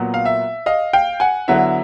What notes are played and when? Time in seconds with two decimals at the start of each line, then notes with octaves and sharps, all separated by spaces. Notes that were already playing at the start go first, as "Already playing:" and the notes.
Already playing: A#2 F#3 B3
0.14 F5
0.25 E5
0.66 D#5 F5
0.93 F5 G5
1.20 F#5 G#5
1.48 D3 F#3 B3 E4 E5